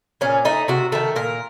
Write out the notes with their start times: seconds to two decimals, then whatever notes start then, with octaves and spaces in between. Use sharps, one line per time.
0.21 A#2 C#4
0.45 A3 D#4
0.68 C3 F#4
0.92 D#3 A3 A4
1.16 A#2 A#4